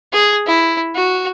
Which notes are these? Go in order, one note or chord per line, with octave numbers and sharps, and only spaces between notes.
G#4
E4
F#4